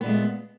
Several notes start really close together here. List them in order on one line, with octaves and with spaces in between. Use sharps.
B3 A#2 A3 G#3